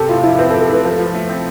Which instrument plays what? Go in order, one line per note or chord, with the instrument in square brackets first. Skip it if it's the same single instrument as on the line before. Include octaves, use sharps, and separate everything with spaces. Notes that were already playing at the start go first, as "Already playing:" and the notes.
Already playing: [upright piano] C3 G4 [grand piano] A4
[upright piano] A2 [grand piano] F4
[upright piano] F3 [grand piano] E4
[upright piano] C4 [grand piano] B4
[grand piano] A4
[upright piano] G4
[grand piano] A4
[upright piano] A2 [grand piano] B4
[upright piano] F3 [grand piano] A4
[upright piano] F3
A3
C4